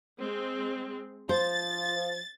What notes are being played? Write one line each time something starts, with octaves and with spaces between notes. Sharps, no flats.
G#3 C4
F3 C5 A6